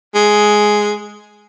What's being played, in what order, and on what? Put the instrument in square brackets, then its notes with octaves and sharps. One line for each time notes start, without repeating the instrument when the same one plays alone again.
[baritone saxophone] G#3